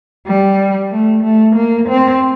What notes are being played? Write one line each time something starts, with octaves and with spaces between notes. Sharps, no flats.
G3
A3
A3
A#3
C4